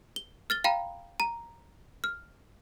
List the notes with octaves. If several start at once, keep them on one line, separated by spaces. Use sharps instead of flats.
G7
F6 A6 G7
F5 G5 A#5 B5
A#5
F6